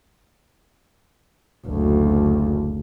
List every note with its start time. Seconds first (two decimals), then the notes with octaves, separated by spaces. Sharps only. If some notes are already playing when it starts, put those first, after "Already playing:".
1.67 F#1 D2